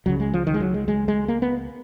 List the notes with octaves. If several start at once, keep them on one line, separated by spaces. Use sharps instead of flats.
C#2 C#3 F#3
G#3
F3
D#3
G#3
F#3
G#3
G#3
G#3
A#3
B3